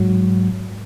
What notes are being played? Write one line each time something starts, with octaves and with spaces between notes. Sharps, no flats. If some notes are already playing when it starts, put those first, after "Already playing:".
Already playing: G#2 F#3